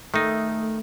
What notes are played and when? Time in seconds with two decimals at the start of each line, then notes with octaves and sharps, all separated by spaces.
0.14 D#3 A3 D#4